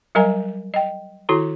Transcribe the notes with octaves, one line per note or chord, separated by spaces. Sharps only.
F#3 G3 A#4 D#5 G#5 A#5
D#5 G5
D#3 E4 F#4 A4 A#5